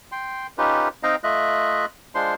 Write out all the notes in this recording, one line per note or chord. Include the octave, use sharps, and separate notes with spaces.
G5 C6
C#4 D#4 F4 G4 B4
C4 D#4 D#5 F5 G5 A#5
A3 F4 D#5 E5 F#6
G#3 D4 F4 C5 C6